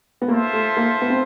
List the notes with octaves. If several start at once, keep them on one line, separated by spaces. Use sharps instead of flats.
B3
A#3 F4 A4 C5 E5
A3
A#3
B3
C4